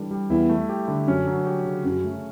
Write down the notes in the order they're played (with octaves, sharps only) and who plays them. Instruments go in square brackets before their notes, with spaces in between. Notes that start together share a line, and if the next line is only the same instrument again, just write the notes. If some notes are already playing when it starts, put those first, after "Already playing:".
Already playing: [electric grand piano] E3 G3 D4 A4
G3
[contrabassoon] E2 [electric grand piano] E4
[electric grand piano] A3
G4
D3
[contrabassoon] F#2 [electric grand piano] C#4
[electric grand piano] F#3
G4
C#3
[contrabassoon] F#2 [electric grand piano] C#4
[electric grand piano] A3